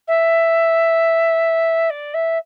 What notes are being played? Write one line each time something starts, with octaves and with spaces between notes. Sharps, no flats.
E5
D5
E5